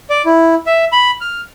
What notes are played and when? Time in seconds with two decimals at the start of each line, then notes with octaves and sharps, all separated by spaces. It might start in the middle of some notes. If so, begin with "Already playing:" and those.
0.10 D5
0.25 E4
0.66 E5
0.92 B5
1.21 F6